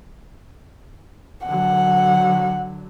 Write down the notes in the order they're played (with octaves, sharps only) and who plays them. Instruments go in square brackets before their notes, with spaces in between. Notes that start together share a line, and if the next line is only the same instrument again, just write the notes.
[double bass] D3 F#3 [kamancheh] F#5